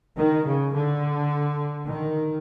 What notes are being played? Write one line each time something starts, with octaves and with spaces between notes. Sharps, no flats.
D#3
C#3
D3
D#3